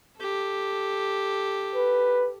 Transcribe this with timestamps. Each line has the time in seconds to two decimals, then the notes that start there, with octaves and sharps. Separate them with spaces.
0.19 G4 A4
1.75 B4